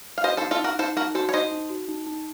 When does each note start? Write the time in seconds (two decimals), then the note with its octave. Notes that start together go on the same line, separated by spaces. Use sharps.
0.18 F5
0.24 F#4 C5 D#5
0.37 A4 C5
0.41 D#4
0.51 F4 A4
0.60 D#4 F#4 A#4
0.79 D#4 A4 C5
0.97 D#4 F#4 A#4
1.15 F#4 A4 C5
1.29 C#5
1.33 D#4 C5 D#5
1.51 D#4
1.70 F#4
1.88 D#4
2.07 D#4